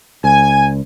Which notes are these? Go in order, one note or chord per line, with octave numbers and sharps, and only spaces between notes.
C#2 G#5